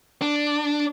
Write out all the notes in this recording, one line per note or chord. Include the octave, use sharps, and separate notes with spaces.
D4